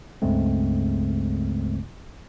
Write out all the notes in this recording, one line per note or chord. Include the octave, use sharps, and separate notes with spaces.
C#2 G2 C#3 G#3 A3 C4